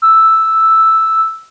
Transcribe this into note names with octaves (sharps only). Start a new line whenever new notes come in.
E6